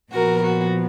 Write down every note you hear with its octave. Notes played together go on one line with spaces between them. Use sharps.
A#2 F3 B3 F#4 A#4
F#4